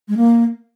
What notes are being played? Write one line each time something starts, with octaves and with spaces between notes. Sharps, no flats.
G#3
A#3